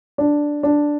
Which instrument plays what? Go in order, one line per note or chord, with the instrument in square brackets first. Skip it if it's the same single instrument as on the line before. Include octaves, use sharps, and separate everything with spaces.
[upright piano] D4
D4